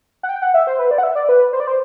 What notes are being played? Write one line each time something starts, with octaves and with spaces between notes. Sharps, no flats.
F#5
G5
F#5
E5
C5
B4
D5
F#5
E5
D5
B4
C5
D5
C5